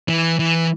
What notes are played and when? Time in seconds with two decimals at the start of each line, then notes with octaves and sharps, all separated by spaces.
0.08 E3
0.39 E3